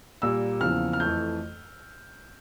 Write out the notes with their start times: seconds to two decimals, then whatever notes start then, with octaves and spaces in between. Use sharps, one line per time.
0.22 A#2 G3 A#3 E6
0.61 E2 C#3 F3 A#3 F6
0.93 F6
1.00 F2 E3 A3 G6